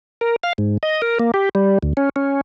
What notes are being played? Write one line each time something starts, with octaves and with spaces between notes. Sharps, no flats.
A#4
F5
G#2
D#5
A#4
A#3
G4
G3
D2
C#4
C#4